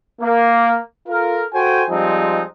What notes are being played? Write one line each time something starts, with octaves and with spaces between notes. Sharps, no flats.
A#3
F4 A4 A#4
F#4 A4 C5 G5 G#5
F3 G3 G#3 C4 D#4